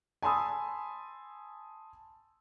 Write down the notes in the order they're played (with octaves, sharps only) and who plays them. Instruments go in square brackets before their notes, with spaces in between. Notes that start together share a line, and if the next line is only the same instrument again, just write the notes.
[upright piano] G#5 A5 B5 C6 D#6 E6